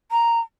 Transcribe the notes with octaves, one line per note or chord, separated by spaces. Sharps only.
A#5